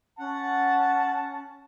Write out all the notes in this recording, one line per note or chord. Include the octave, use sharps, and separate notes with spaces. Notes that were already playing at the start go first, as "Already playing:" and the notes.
C#4 F#5 A5